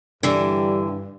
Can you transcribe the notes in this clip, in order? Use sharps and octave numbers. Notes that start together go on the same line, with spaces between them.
G2 D3 E3 G3